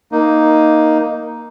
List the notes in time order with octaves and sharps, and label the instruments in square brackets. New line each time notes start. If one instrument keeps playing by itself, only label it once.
[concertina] A#3 D#4